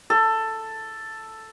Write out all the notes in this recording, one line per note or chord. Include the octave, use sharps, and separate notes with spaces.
A4